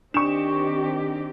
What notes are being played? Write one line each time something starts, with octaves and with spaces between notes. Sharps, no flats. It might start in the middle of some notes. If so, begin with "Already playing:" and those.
D#3 C4 D4 G4 C#6 E7